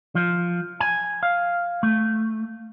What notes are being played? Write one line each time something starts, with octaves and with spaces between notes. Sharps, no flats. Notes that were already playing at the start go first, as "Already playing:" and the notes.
F3
G#5
F5
A3